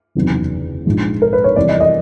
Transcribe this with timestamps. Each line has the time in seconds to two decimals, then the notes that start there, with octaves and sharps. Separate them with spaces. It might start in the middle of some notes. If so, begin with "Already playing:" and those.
0.15 F#1 E2 C3 D#3 F#3
0.86 A#1 G#2 F3 G#3
1.22 A#4
1.33 B4
1.44 C#5
1.56 F2 C3 E3 G3 D5
1.69 D#5
1.80 D#5